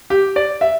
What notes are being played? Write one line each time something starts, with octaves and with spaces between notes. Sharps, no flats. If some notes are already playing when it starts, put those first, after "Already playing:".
G4
D5
E5